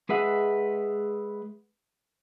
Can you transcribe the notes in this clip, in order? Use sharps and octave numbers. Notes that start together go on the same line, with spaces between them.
G#3 G#4 B4 E5 F#5